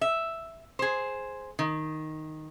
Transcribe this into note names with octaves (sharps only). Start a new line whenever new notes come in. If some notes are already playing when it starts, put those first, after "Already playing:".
E5
G#4 C5
D#3